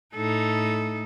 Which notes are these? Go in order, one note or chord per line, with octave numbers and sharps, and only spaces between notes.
A2 D#4 A4